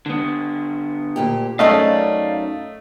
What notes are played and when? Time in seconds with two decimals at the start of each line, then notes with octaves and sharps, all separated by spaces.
0.06 D3 B3
1.16 D2 A#2 G4
1.59 F#2 A3 C#4 D#4 D5 D#5 F5